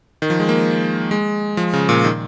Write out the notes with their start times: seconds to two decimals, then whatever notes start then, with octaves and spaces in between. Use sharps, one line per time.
0.22 D#3
0.30 F3
0.40 G#3
0.49 A#3
1.11 G#3
1.57 F3
1.73 C#3
1.89 A#2
2.04 D#3